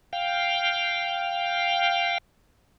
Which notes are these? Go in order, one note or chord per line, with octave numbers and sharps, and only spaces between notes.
F5 G5